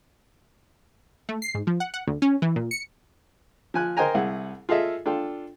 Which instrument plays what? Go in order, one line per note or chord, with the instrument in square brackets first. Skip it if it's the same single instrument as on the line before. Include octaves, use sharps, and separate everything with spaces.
[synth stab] A3
C7
G#2
F3
F#5
F#5
D2
C#4
E3
A#2
C#7
[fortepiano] F3 G#5 F#6
A#4 C5 D#5 G5 G#5 A#5
C2 E4 G#4 F#5
F4 G#4 A4 D#5 E5
D4 F4 A4 G5